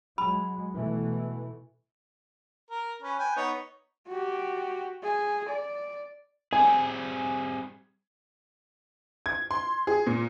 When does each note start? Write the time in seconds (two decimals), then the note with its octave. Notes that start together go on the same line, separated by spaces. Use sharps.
0.18 F#3 G#3 B5
0.75 B2 E3 A3
2.70 A#4
3.02 C#4 B4
3.19 B4 G5 G#5
3.36 B3 D#4 C#5
4.08 F#4 G4
5.03 G#4
5.49 D5
6.53 G3 C4 G#4 G#5
9.26 G#6
9.51 C6
9.87 G#4
10.07 A#2